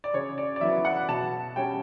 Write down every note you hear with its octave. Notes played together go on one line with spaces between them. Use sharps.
D5
C#3 C#5
D5
D5
F#3 B3 E4 E5
F#5
B2 A5
G3 C#4 G5